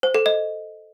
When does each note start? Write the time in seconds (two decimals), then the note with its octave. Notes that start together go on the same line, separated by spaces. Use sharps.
0.03 C5
0.14 A4
0.26 D#5